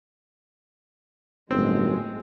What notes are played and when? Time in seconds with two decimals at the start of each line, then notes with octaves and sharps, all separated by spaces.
1.51 G1 A2 D#3 F#3 G#3 C4